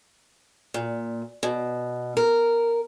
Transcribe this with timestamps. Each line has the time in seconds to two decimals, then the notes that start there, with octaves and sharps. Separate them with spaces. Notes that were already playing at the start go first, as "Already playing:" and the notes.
0.74 A#2
1.43 B2
2.17 A#4